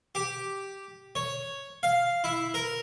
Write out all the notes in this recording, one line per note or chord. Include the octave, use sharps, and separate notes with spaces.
G4
C#5
F5
E4
A#4